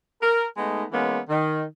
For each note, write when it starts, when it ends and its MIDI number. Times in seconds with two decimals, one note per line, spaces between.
0.22 0.45 70
0.57 0.85 56
0.57 0.85 57
0.57 0.85 59
0.57 0.85 63
0.92 1.19 52
0.92 1.19 56
0.92 1.19 58
0.92 1.19 59
0.92 1.19 61
1.29 1.63 51